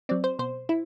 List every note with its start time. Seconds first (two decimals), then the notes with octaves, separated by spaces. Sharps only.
0.09 F#3 C4 D5
0.24 C5
0.39 B2 C5
0.69 E4